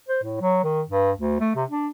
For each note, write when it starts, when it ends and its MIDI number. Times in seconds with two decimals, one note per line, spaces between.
0.08 0.19 72
0.22 0.38 45
0.41 0.59 54
0.63 0.82 51
0.88 1.11 43
1.17 1.40 38
1.40 1.52 57
1.55 1.64 48
1.70 1.89 62